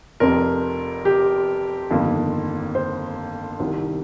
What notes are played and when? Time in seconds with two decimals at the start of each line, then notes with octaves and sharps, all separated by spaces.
0.20 F1 F2 C3 A#4
1.05 G4
1.91 G1 F2 D#3 A#3
2.75 C5
3.60 C2 C3 D#3